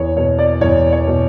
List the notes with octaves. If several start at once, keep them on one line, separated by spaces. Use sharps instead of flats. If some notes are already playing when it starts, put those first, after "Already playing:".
Already playing: E2 C#5
B2 C#5
D5
E2 C#5
C#5
B2